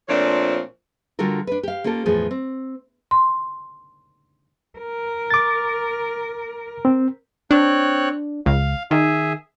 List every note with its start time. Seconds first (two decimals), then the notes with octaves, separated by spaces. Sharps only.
0.09 A#2 F3 A3 C4 D4 C#5
1.19 D3 G3 F4 F#4 A4 A#4
1.47 D4 B4
1.63 G4 F5
1.84 A#3 C#4 F4 G4 A4
2.06 E2 A2 F3 G#4
2.31 C4
3.11 C6
4.79 A#4
5.30 D6 A6
6.85 C4
7.51 C4 D4 C#5 F#6
8.46 C#2 F5
8.91 D#3 G#4 E5